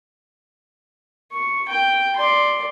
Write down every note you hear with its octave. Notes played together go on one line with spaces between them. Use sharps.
C#6
G5
D5 C6